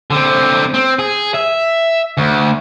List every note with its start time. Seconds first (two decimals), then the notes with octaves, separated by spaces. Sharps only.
0.10 D3 C4
0.74 C4
0.99 G#4
1.34 E5
2.17 D2